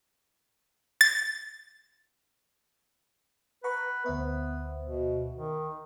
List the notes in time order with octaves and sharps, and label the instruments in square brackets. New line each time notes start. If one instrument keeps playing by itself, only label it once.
[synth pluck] A6
[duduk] B4 [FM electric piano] F#5 A#5 C#6
[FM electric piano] D2 C5 E5 [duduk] B3
[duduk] B2
D#3